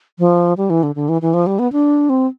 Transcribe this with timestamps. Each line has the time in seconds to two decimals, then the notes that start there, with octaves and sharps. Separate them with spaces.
0.19 F3
0.57 G3
0.70 E3
0.83 D3
0.95 D3
1.09 E3
1.22 E3
1.34 F3
1.47 G3
1.59 B3
1.72 D4
2.09 C4